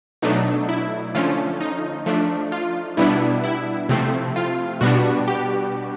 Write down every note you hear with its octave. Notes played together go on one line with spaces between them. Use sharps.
B2 F#3 A3 D4 D#4
E4
D3 F3 A3 C#4 F4
D#4
F3 A3 D4
F4
B2 G3 B3 D4 E4
E4
C3 F3 A3 C4
F4
B2 G3 B3 D4 F#4
G4